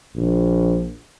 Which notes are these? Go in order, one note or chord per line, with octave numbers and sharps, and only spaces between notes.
A#1